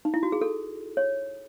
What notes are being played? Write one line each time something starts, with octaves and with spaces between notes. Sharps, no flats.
D#4
E4
F#4
G#4
A4
C#5